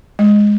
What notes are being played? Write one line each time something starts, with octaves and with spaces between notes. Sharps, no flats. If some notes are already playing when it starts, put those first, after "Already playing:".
G#3